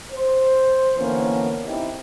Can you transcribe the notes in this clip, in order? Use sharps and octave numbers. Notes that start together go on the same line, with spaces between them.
C5
D3 E3 A#3 B3 C#4
C4 D#4 E4 G4